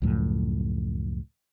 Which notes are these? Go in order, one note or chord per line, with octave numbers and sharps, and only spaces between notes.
C#2 F#2 A2 F3